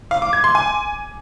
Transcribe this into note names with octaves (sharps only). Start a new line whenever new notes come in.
F5
D6
G#6
C6
G#5